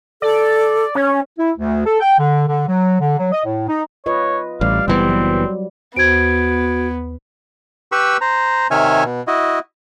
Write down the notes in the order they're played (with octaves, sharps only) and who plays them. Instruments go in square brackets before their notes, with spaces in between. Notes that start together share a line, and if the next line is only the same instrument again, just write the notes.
[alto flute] A4 [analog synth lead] D5
[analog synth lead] C#4 [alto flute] C#5
[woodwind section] E4
D2
A4
G5
D3
D3
F#3
D3
F#3
D#5
A2
D#4
[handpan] F4 B4 D#5 [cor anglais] C#5
[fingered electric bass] A1 [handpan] G3 D5 [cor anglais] F5
[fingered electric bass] F#1 E3 B3 [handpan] G3 [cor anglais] C4
[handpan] F#3
[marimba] D#2 C5 [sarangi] B3 [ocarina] F#4 [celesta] G#6 D7
[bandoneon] G4 B4 B5 C#6 E6
C5 A#5
C3 D#3 C#5 E5 G#5 F6
B2
E4 F#4 D#5